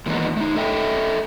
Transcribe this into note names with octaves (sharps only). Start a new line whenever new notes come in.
A#2 D#3 E3 G#3 B3 D#4
A3 D#4
A4 D#5 E5 G5